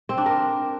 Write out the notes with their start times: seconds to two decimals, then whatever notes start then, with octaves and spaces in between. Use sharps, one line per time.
0.09 C4
0.18 D4
0.26 A#4